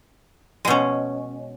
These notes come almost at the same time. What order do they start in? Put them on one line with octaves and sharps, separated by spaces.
G#3 B2 C#4